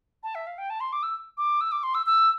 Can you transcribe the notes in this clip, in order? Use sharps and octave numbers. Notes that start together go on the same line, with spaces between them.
A5
E5
F5
G5
A5
C6
D6
E6
D6
E6
D6
C6
E6
E6